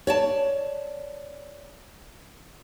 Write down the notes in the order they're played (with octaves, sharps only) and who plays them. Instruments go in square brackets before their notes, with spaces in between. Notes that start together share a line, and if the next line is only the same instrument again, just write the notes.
[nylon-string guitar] C#5 D5 A5